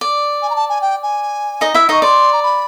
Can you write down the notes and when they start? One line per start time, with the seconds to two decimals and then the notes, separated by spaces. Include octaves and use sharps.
0.01 D5
0.42 G#5
0.49 A#5
0.55 A5
0.69 G#5
0.81 G5
1.02 G#5
1.61 D#4 D#5
1.74 E4 E5
1.89 D#4 D#5 C#6
2.02 D5 C6
2.32 A#5
2.42 B5